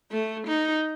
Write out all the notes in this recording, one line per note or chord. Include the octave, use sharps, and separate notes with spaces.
A3
D#4